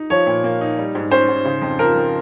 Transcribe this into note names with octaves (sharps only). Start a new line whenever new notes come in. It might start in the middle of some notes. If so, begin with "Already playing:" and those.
Already playing: D#4
F3 C#5
A#2
A#3
D#4
G3
G#2
C#4 C5
G#2
C#3
F2
F3 A#4
F2